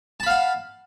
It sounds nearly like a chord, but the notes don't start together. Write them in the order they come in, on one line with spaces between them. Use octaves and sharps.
A5 B5 F5 F#5